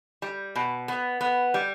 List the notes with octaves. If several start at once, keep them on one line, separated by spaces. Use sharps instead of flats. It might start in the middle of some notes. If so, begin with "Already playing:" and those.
G3
B2
B3
B3
G3